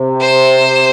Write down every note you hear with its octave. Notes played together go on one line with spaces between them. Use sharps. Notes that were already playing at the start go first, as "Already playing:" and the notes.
Already playing: C3
C5